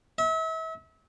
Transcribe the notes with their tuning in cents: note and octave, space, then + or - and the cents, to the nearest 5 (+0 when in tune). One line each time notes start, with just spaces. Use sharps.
E5 -35